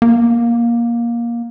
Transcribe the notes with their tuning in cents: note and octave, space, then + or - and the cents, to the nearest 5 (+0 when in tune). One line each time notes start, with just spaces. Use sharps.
A#3 +15